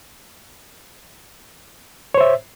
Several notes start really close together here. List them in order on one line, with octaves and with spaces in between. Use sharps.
C#5 C5 E5